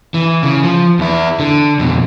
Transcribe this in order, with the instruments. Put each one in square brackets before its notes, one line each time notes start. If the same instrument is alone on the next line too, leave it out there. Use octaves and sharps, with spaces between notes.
[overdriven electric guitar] E3
C#3
F3
E2 E4
D3
F2 B2